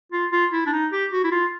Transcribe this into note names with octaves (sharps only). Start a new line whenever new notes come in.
F4
F4
E4
D4
D#4
G4
F#4
E4
F4